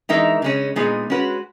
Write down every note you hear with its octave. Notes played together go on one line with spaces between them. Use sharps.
E3 G#3 D#4 A#4 E5
C#3 G#3 C#4
A#2 G#3 B3 D#4 G#4
G#3 C#4 F#4 B4